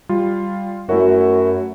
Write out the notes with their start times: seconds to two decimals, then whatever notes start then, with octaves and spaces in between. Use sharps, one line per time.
0.09 G3 F4
0.89 F#2 A3 E4 F#4